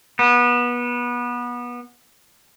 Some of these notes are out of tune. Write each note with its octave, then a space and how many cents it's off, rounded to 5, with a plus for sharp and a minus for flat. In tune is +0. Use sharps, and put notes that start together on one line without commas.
B3 -25